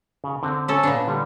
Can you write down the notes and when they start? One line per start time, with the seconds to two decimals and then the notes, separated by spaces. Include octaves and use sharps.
0.24 C#3
0.43 D3 C4
0.68 C#4 A4
0.83 A#2 B3 D4
1.08 D3 G3